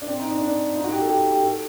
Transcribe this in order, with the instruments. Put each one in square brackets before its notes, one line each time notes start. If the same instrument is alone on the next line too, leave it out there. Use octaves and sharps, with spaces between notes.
[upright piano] D4
C4
D#4
D4
D4
D#4
F#4
G4
A4
G4
G4
A4